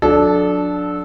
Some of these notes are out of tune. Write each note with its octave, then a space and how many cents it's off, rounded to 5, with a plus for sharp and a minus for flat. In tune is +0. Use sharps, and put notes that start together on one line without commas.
F#3 -40 D4 +0 A4 -15